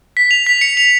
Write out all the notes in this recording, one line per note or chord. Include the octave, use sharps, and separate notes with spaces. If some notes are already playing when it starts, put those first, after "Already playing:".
B6
F7
B6
C#7
F7